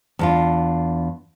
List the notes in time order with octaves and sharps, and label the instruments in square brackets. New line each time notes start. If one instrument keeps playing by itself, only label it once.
[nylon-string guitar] E2 D4 F4